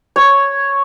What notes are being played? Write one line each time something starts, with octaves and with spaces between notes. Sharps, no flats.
C#5